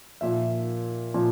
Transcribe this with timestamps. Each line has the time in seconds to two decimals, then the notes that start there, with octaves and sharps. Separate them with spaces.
0.21 A#2 F3 E5
1.14 A#2 F3